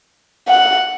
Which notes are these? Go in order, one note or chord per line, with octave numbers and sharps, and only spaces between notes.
F#5